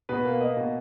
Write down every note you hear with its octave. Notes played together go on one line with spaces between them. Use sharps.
B2 B4
A#3
A#3 D#5
B2